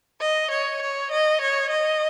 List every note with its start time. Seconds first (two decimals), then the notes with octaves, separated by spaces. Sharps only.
0.21 D#5
0.51 C#5
0.82 C#5
1.12 D#5
1.41 C#5
1.71 D#5